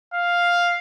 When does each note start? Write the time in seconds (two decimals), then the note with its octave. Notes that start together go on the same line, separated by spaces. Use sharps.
0.14 F5